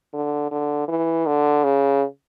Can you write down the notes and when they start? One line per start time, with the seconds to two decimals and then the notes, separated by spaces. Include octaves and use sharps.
0.13 D3
0.51 D3
0.88 E3
1.26 D3
1.64 C#3